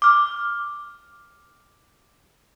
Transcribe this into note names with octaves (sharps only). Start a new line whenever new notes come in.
D6 F6